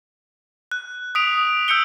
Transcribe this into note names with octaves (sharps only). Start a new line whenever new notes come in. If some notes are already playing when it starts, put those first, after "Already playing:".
F#6
D#6 B6 D7 F7
E6 G6 C#7 D7 G7